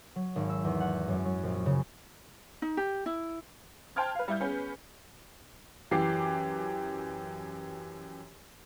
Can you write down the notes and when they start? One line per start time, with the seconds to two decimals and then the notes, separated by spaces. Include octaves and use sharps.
0.16 F#3
0.36 G#1
0.49 E6
0.64 E2
0.80 F#5
1.08 F#2
1.25 F#3
1.43 A#1
1.66 C#3
2.62 D#4
2.77 G4
3.06 E4
3.96 C5 G5 A5 C6 F6 G#6
4.15 B4 F5
4.28 G3 E4 G6
4.40 B3 C#4 G#4 B4
5.91 F#2 E3 G4 D6 C7